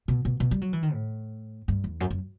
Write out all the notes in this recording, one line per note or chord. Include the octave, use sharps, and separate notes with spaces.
B2
B2
B2
G3
F#3
E3
D#3
A2
G2
E2
F#2
F#2